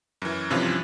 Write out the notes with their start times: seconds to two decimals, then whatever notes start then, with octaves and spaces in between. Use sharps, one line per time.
0.22 F#2 E3
0.50 G2 C3 E3 F3 C#4 F4